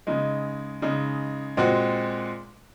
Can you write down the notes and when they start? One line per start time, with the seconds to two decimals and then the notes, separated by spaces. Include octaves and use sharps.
0.07 C#3 G#3 D#4
0.82 C#3 G#3 D#4
1.57 A#2 G#3 C4 F#4